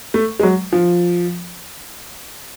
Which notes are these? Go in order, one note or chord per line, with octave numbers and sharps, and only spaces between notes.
A3
G#3
F#3
F3